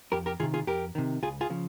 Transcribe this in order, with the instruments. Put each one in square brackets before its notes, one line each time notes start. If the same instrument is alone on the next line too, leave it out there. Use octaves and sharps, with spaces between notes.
[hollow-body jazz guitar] F2 G4 A#4
G4 A#4
D#3 F4 G#4
C3
F4 G#4
F2 G4 A#4
C3 D#3
C#2 F4 G#4
F4 G#4
C#3 F3